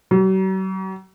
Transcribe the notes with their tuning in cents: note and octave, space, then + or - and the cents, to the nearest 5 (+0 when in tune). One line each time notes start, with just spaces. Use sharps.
F#3 +45